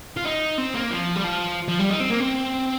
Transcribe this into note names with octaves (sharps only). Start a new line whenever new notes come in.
F4
D#4
C4
A#3
F3
G3
F3
F3
G3
D#4
C4
A#3
C4